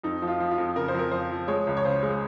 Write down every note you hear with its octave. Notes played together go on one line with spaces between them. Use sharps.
F2 D#4
F3
F4
F3
F4
F2
C#3 A#4
C5
F2 A#4
F3 C5
F3
G#3 C#5
C#2
C#5
C#3 C5
G#3